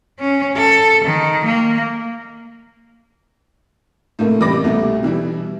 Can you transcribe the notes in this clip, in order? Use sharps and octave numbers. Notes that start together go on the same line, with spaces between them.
C#4
A4
D#3
A#3
A2 C3 A3 A#3
A1 C3 G3 B5 D6 A#6
C2 B2 A3
B2 E3 G3 E4